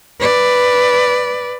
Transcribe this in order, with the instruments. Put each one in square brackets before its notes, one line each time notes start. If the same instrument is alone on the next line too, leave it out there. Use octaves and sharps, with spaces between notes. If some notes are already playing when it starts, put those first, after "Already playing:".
[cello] B4 D5